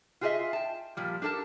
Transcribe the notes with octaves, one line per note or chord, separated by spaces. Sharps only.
F4 F#4 G#4 A4 D#5 E5
G5 A5
A#2 F3 G3
D4 G4 A4 A#4 A5